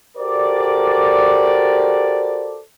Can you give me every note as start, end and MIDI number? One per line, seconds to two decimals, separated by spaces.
0.18 2.60 66
0.18 2.60 67
0.18 2.60 69
0.18 2.60 70
0.18 2.60 72
0.18 2.60 74